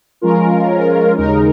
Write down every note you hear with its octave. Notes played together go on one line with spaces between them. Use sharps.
F3 G#3 C#4 F4 A#4
D#2 C#3 G#3 D#4 A#4